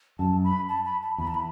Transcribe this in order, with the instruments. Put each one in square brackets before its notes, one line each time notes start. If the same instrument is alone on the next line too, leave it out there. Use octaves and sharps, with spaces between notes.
[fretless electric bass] F#2 [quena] A5
[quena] B5
A5
B5
A5
[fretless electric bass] E2 [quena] B5
[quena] A5
B5